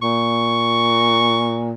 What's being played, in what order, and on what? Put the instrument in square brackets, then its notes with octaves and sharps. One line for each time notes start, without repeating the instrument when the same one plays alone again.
[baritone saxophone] A#2 [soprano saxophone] C#6